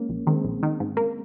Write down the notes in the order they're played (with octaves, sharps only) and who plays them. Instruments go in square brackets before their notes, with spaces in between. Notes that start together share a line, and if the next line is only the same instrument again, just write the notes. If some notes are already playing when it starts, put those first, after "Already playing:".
Already playing: [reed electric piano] G#3 A#3 C#4
[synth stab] A#1
[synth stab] D#3 [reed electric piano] G#3 C4
[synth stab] A#1
D#3
G#2
A#3